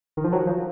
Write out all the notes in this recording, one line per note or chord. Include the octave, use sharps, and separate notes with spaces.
D#3
F3
F#3
F3